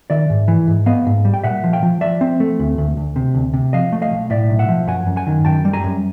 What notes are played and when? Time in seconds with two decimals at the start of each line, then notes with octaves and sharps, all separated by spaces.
0.10 D#3 D5 E5
0.30 G#2
0.48 E3
0.68 G#2
0.86 B3 D#5 F5
1.06 G#2
1.25 G3
1.34 G5
1.44 A#2 E5 F#5
1.64 F3
1.73 F5 G5
1.82 F3
2.01 F3 D5 E5
2.21 C4
2.40 A3
2.59 D2
2.78 D2
2.97 D2
3.16 C3
3.35 D2
3.54 C3
3.73 F3 D#5 F5
3.92 A3
4.02 D#5 F5
4.11 B1
4.30 A2 D5 E5
4.50 B1
4.59 E5 F#5
4.68 F3
4.88 F#2 F#5 G#5
5.07 F#2
5.16 F#5 G#5
5.27 D#3
5.45 F#2 G5 A5
5.65 G3
5.73 G#5 A#5
5.84 F#2